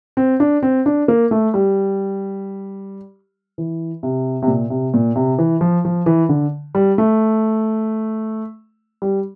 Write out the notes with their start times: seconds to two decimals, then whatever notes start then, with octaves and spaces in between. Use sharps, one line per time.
0.17 C4
0.40 D4
0.62 C4
0.86 D4
1.08 A#3
1.31 A3
1.54 G3
3.58 E3
4.03 C3
4.42 C3
4.47 A#2
4.70 C3
4.94 A#2
5.16 C3
5.38 E3
5.61 F3
5.85 F3
6.06 E3
6.29 D3
6.75 G3
6.98 A3
9.02 G3